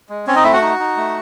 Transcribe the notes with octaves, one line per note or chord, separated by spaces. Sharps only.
G#3
C4 C#4 C#5
D#4 D#5
A3 E4 E5
F#4 F#5
D#4
D#4
A3